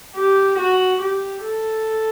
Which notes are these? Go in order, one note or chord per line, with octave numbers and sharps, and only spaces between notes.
G4
F#4
G4
A4